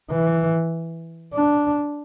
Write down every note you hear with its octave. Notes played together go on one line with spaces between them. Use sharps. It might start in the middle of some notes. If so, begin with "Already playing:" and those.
E3
D4